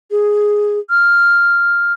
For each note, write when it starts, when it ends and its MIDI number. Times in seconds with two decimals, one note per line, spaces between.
0.11 0.79 68
0.90 1.93 89